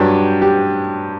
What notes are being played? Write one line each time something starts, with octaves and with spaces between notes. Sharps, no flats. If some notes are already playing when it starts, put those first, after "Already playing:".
Already playing: G2 F#3 G4
G4